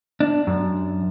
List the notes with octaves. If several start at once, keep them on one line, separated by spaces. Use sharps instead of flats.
D4
F#2